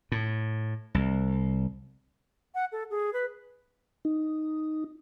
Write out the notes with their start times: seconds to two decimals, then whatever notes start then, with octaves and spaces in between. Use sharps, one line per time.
0.12 A2
0.95 C2
2.55 F#5
2.72 A4
2.90 G#4
3.13 B4
4.05 D#4